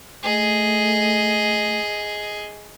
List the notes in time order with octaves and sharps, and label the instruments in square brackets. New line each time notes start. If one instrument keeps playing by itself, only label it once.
[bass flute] A3 [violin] G#4 D#5